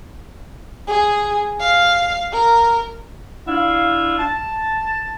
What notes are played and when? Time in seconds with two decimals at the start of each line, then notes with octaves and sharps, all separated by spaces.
0.87 G#4
1.60 F5
2.32 A#4
3.48 D4 E4 F4 F5
4.18 A5